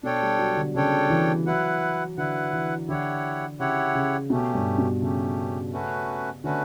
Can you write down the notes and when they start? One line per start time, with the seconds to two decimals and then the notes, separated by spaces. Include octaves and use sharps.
0.03 B2 D4 A4 C#5 G5
0.22 G3
0.39 F#3
0.57 D3
0.75 C#3 D4 A4 C#5 G5
1.10 E3
1.47 F#3 E4 B4 F#5
2.17 D3 E4 B4 F#5
2.53 E3
2.88 D3 E4 G4 C#5 F#5
3.59 C#3 E4 G4 C#5 F#5
3.95 C#3
4.30 B2 A3 C#4 G4
4.54 G2
4.78 B2
5.02 C#3 A3 C#4 G4
5.73 A3 C#4 F#4 B4
6.44 D3 A3 C#4 F#4 B4